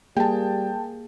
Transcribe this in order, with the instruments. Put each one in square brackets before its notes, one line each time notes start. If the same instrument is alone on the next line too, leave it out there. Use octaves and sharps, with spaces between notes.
[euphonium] G3 [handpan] A#3 G#4 [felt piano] G5 A5